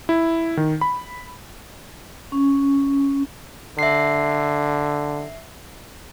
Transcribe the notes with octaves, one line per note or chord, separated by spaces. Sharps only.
E4
D#3
B5
C#4
D3 E5 C7